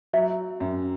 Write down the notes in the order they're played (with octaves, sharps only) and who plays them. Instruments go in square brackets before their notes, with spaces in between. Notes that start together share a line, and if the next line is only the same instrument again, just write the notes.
[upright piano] F#3 [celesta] E5
[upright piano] F#2